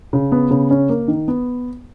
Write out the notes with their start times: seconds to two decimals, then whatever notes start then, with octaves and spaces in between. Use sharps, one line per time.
0.13 C#3
0.32 B3
0.51 C#3
0.71 C#4
0.89 A#3
1.08 D#3
1.28 B3